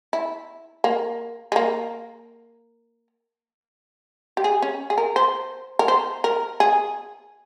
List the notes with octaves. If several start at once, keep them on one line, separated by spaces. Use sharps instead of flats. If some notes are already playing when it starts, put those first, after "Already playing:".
E4
A#3
G#3
A#3
G4
G#4
C#4
G#4
A#4
C5
A#4
C5
A#4
G#4